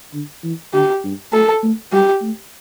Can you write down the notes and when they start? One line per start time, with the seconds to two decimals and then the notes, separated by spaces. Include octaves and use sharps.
0.13 D3
0.44 E3
0.74 D3 G4
1.04 G2
1.33 A3 A4
1.63 A3
1.93 G3 G4
2.22 A3